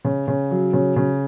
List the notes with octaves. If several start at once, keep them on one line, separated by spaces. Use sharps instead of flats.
C#3
C#3
F#3
C#3
C#3